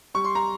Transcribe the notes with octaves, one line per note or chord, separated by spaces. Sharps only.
G3 C#6
C6
A#5